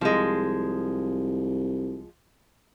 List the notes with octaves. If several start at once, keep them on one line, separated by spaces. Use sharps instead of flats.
C2 F3 G#3